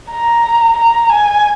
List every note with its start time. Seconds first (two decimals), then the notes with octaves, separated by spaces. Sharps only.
0.10 A#5
0.76 A#5
1.10 G#5